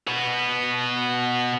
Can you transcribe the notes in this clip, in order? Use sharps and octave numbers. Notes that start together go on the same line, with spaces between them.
B2 B3